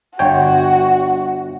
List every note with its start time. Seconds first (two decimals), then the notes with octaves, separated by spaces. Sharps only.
0.19 G1 F#4 C#5 G5